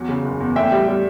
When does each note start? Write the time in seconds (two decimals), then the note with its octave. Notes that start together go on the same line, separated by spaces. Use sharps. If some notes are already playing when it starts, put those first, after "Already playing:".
Already playing: E2 F#3
0.09 C#3
0.25 F#1
0.40 E2
0.56 A2 E5 G5
0.72 G3
0.88 G3